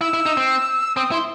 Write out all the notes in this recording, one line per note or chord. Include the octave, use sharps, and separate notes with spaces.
E4 E6
E4
D#4
C4
C4 D#6
E4 C6